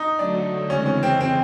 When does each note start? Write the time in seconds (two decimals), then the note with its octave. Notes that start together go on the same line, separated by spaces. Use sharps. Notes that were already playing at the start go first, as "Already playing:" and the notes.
Already playing: D#4
0.19 D3 F#3 A3 D4
0.69 C#3 E3 G#3 C4 C#4
0.86 C#4
1.03 C4
1.20 C4